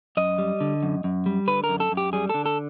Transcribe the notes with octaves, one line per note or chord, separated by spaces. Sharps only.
F#2 D#5
G3
D3
F#2
F#2
G3
D3 B4
A#4
F#2
A4
F#2
G4
G3 G#4
D3 A4
A4